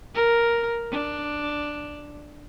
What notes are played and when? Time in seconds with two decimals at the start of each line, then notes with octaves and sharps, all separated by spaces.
0.15 A#4
0.91 D4